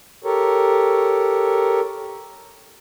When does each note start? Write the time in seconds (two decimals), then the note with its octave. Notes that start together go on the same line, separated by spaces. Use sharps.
0.24 G4 A4 A#4 C#5